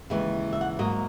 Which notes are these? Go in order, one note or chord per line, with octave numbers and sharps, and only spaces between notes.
D#2 C#3 E3 G#3
E5
F#5
G#2 F#3 A#3 D#5